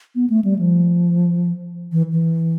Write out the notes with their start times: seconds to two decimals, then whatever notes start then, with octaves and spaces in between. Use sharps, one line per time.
0.15 B3
0.30 A3
0.44 G3
0.59 F3
1.92 E3
2.12 E3